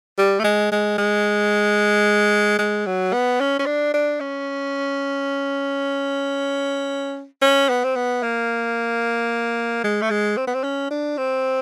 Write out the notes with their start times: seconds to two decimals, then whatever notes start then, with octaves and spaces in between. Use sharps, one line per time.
0.18 G3
0.40 A3
0.44 G#3
0.72 G#3
0.98 G#3
2.59 G#3
2.86 F#3
3.13 B3
3.40 C#4
3.59 C#4
3.66 D4
3.94 D4
4.20 C#4
7.42 C#4
7.69 B3
7.84 C4
7.96 B3
8.23 A#3
9.84 G#3
10.02 A3
10.11 G#3
10.38 C4
10.47 B3
10.55 C4
10.64 C#4
10.91 D4
11.18 C4